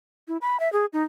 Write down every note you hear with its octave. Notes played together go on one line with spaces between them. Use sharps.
E4
B5
E5
G#4
D#4